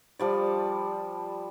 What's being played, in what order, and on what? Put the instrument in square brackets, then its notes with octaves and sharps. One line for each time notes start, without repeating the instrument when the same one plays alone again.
[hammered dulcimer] F3 G3 D5